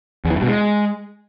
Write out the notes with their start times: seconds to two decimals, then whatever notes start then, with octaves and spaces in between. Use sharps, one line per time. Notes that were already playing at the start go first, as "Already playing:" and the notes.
0.25 E2
0.30 E3
0.36 G2
0.42 B2
0.48 G#3